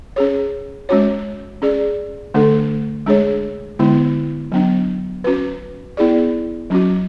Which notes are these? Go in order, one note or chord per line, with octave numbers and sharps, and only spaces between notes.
C#4 G#4 C#5
G#3 C#4 F#4 C#5
C#4 G#4 D5
D3 A3 D4 A4
G#3 D4 G#4 C#5
D3 G#3 B3 E4
F#3 B3 D4
C#4 F#4 B4
B3 E4 G#4 D5
F#3 C#4 F#4